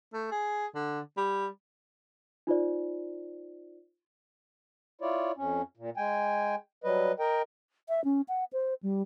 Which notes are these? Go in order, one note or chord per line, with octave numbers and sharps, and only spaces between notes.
A3
G#4
D3
G3
D#4 F4 C5 D5
E4 F4 C#5 D5
F2 C#4
A#2
G#3 G5 G#5
F#3 G3 B4 D#5
A#4 D#5 G5
E5
C#4
F#5
C5
G3